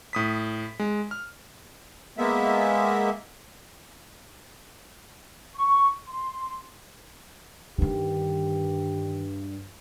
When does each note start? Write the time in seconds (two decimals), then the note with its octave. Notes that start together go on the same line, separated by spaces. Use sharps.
0.13 A2 D#6 B6
0.79 G#3
1.11 F6
2.18 G#3 A#3 B3 E5
5.56 C#6
6.07 C6
7.78 G2 D3 D#3 G4